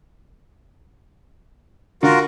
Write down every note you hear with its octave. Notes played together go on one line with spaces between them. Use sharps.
D3 F4 F#4 A#4